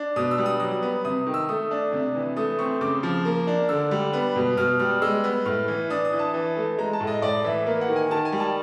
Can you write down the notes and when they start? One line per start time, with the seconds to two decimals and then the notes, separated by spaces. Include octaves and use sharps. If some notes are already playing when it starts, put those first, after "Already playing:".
Already playing: D4
0.16 B2 D#6
0.31 E6
0.38 G3
0.46 D#6
0.60 F#3 D#6
0.82 B3
1.04 C3 D#6
1.27 D#3
1.34 E6
1.49 A3 D#6
1.71 D4
1.92 C3
2.15 E3
2.37 A3 D#6
2.59 C4 C#6
2.81 C#3 D6
3.03 F3
3.25 A#3
3.47 D4
3.69 D3 E6
3.91 G3
4.13 B3
4.36 B2
4.57 B2 F6
4.79 G3 F6
5.02 G#3 E6
5.24 B3
5.45 A2 F6
5.68 E3
5.90 D4 D#6
6.05 D#6
6.13 E3
6.19 A5
6.34 E3
6.57 A3
6.78 G#3 A#5
6.93 A5
7.00 A2
7.07 D#5
7.22 A2 D5
7.44 E3 E5
7.66 A#3
7.81 F#5
7.88 D#3
7.96 G#5
8.11 D#3 A5
8.25 G#5
8.32 G3
8.40 A5